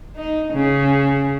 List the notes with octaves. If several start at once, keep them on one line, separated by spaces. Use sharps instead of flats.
D#4
C#3